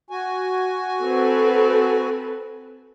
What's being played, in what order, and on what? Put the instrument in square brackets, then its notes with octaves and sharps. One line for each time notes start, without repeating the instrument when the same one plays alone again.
[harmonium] F#4 G#5
[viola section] C4 A4 B4